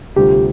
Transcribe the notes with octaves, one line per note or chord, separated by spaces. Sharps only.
D2 C3 G3 C4 F4 G4